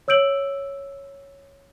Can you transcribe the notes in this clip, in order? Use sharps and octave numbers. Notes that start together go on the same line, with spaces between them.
C#5 E6 G6 D7 F#7